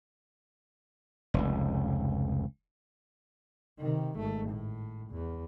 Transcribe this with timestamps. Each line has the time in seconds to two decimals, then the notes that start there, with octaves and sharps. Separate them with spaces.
1.34 F1 C#2
3.79 C3 D#3
4.18 G#1 A3
4.49 A2
5.10 E2